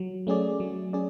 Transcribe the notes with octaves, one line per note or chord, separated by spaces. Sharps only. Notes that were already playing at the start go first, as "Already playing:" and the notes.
Already playing: F#3
A3 C#4 G#4 D5
F#3
C#4 G#4 D5